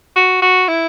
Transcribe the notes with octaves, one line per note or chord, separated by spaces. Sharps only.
F#4
F#4
E4